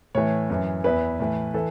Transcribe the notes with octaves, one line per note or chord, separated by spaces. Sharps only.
A2 E3 C#5
F#2 E3
E2 E3 B4
A2 E3
E3 A4